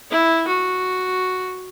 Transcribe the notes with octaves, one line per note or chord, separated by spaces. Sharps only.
E4
F#4